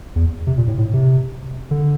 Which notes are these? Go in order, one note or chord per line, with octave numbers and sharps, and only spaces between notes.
E2
C3
A#2
A2
A2
C3
D3